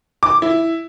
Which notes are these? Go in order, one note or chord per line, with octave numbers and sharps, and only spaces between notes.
D6
E4